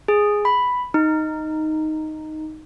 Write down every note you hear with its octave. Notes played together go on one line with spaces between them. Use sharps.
G#4
B5
D#4